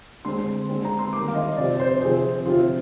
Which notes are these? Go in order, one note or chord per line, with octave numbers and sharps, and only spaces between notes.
D3 G#3 C4 C6
D3 G#3 C4
A#5
C6
D#3 G3 A#3 D6
F5
D#5
C3 F3 C4 D5
C5
C3 F3 C4 G#4
C3 F3 C4 F4